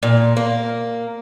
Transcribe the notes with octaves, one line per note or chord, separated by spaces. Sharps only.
A#2
A#3